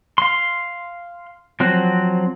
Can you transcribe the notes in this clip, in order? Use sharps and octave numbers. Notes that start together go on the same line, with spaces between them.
F5 C6
F3 F#3 C4 F#4